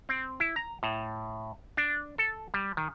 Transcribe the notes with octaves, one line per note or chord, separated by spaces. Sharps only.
C4
E4
A#5
A2
D4
A4
G3
D#3